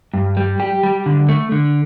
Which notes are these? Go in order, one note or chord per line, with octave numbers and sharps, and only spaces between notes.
G2
G3
G4
G3
D3
A3
D3